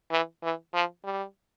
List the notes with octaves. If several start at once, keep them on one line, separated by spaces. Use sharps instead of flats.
E3
E3
F3
G3